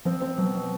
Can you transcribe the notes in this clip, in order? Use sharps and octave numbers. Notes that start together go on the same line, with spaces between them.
F3 C4
C4
B2 F#3
B2